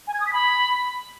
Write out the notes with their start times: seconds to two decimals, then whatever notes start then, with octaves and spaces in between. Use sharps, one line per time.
0.07 G#5
0.14 G#6
0.20 D#6
0.27 B6
0.33 B5